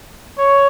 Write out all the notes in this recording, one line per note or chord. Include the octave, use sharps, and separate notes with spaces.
C#5